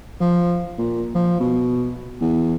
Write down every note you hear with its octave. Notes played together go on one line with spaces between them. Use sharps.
F3
A#2
F3
B2
E2